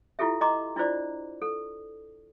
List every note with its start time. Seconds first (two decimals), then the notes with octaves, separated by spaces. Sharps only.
0.19 E4 F4 G4 A4 E5
0.41 D#5 A#5 C6 D6
0.76 D4 E4 F4 C5 D5
1.42 A4